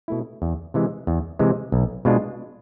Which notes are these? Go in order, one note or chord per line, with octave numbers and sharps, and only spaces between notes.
B2 A3 E4
E2
C3 E3 G#3
E2
C3 E3 G#3
B1
B2 G#3 D4 F4